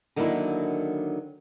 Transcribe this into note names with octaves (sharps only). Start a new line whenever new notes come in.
D3 D#3 F#3 A#3 D4 E4